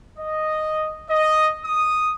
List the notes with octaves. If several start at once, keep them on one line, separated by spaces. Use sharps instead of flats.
D#5
D#5
D#6